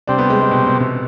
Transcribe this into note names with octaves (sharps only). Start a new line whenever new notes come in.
C3 G3 C4 D4
B3
G#3
G#3
B2
B2
C3